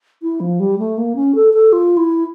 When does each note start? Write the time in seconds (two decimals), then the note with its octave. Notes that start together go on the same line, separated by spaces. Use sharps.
0.22 E4
0.40 F3
0.60 G3
0.79 A3
0.98 A#3
1.16 C#4
1.35 A4
1.54 A4
1.73 F4
1.97 E4